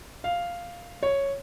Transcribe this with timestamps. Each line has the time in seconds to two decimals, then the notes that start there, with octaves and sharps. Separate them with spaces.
0.24 F5
1.03 C#5